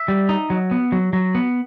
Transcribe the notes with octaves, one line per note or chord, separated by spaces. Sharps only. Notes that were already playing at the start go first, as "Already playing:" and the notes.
Already playing: E5
G3
D#4
F#3
B3
F#3
F#3
B3